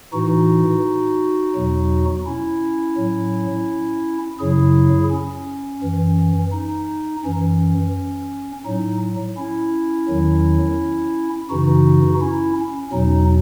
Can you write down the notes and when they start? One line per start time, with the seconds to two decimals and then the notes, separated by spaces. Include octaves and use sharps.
0.13 A2 E3 D#4 F#4
1.55 E2 B2 F#3
2.26 C#4 E4
2.97 A2 F#3
4.39 F#2 C#3 F#3 E4 G#4
5.11 C#4
5.82 F#2 E3
6.52 D#4
7.24 F#2 E3 C#4
8.66 A2 F#3 D#4
9.37 C#4 E4
10.09 E2 D#3 F#3
11.50 F#2 C#3 E3 D#4 F#4
12.21 C#4 E4
12.57 C#4
12.93 E2 B2 F#3 D#4